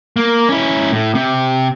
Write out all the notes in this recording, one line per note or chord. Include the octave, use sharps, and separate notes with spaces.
A#3
C#4 E4
A2
C3